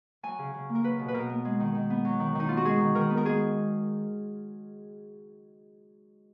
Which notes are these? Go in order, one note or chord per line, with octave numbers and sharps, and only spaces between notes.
F#3 G#5
C#3
C#3
A#3
A#4
F#3 B4
B2
B4
B2 A#4
B3
G#3
D#3
D#3
B3
F#3
D#3
D#3 D#4
B3 F4
F#4
G#3 G#4
D#3
D#3 A#4
B3
A#4
G#3 G#4